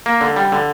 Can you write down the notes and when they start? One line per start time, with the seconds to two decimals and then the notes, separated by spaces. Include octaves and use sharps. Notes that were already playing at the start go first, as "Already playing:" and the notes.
0.06 A#3
0.21 D3
0.36 G3
0.52 D3